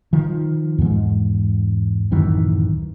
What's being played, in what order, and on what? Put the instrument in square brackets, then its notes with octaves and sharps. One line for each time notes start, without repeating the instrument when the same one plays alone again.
[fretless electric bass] D#3 F3
E2 G#2
D1 F#2 D#3 E3